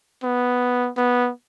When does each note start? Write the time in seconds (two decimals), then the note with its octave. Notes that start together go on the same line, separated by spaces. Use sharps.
0.24 B3
0.97 B3